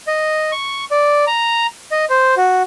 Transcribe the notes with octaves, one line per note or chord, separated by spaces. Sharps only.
D#5
C#6
D5
A#5
D#5
C5
F#4